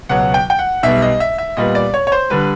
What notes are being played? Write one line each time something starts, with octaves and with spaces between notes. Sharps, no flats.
C#2 B2 F#3 F#5
G5
G5
F#5
B1 B2 G3 E5
D#5
E5
E5
A#2 G3 B3 D#5
D5
C#5
C#5
C5
D3 G3 B4